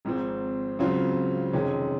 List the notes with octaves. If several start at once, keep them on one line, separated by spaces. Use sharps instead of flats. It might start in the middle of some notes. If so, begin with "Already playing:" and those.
G#1 G#2 F3 C4
C#2 C#3 F#3 C4 F4
F2 C3 D#3 G#3 C#4